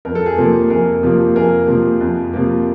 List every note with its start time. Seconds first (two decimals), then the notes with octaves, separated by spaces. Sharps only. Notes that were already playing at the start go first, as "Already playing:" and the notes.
0.05 F2 A#4
0.15 A4
0.26 G#4
0.36 C3 F3 A#3 A4
0.70 F2 G#4 A#4
1.03 C3 F3 A#3
1.36 F2 G#4 A#4
1.68 C3 F3 A#3
2.01 F2
2.33 C3 F3 A#3